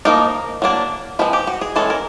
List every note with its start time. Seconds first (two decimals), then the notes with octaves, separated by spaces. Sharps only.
0.05 F3 A#3 D#4 A#4
0.62 F#3 A#3 D4
1.19 F3 G#3 C4 B4
1.33 G4
1.47 F#4
1.61 G#4
1.76 E3 G#3 C#4 A4
1.90 A#4